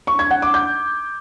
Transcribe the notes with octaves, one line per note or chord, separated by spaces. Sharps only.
C#6
G#6
F#5
D6
G6